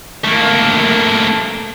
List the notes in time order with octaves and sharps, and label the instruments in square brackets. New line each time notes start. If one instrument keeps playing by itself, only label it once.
[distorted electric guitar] A3 A#3